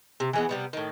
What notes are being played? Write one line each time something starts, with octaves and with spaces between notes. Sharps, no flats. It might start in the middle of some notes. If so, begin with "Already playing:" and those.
C3
E3 G#3 B3
C3 G3 B3
A2 D#3